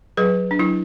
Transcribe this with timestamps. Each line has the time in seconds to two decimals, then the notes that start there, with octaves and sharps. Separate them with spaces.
0.17 F#3 G#4 B4
0.51 D4
0.59 F#3 E4